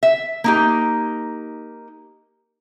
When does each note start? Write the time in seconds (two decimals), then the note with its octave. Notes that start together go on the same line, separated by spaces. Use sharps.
0.03 E5
0.44 A#3 D#4 G4